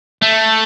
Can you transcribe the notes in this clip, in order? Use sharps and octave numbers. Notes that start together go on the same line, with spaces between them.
A3